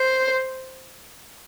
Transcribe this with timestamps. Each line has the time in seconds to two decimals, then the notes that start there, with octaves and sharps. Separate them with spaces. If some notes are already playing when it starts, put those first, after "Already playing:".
Already playing: C5